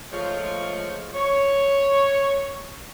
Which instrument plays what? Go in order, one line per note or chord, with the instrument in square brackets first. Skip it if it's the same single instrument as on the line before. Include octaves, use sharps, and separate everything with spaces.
[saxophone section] F3 G#3 A3 F4 C5 C#5
C#5